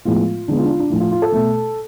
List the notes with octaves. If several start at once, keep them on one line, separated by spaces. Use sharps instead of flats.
A2 F3 G#3 B3 F4
D3 G#3 B3 D4
F4
D4
F4
D4
A2 F3 A3 F4
F4
F4
A4
B2 A3